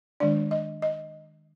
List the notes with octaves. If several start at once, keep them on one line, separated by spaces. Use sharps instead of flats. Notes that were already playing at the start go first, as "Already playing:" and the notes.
D#3 G#3 D4 D5
D#5
D#5